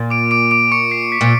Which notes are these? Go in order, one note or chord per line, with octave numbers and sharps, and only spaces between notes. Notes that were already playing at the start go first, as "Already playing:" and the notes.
Already playing: A#2
D6 D7
D6 D7
D6 D7
C#6 C#7
C7
B6
A#2